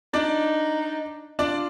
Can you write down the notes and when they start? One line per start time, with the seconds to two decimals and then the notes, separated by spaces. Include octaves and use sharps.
0.13 D4 D#4 D5
1.39 D4 F4 D5